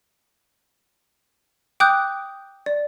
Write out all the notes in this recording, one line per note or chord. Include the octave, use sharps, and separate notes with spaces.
G5 D6 D#6 F#6 G6
D5